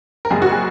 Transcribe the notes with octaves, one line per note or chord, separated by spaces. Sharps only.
A#4
F#1 F#2 C#3 G#3 G#4
F#4
G#4